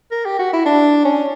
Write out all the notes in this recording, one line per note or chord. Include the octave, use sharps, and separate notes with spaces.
A#4
G4
F#4
E4
D4
C#4